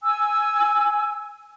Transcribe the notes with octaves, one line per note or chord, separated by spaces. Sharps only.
G#5 E6